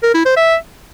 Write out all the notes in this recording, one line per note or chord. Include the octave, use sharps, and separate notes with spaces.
A#4
E4
C5
E5